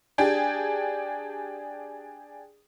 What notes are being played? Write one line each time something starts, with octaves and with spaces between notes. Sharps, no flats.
D4 G4 G#4